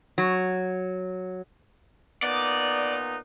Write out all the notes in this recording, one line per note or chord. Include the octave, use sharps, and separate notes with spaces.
F#3
A#2 B3 D#4 D5